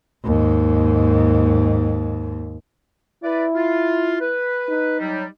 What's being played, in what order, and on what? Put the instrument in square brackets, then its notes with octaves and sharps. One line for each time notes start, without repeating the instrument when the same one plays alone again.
[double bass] D#2 G#2
[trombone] E4 [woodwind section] B4 D5
[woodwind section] F4
B4
[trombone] D#4
[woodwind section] F#3 G3